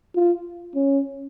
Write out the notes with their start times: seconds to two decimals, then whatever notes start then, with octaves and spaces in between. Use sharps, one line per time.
0.15 F4
0.75 C#4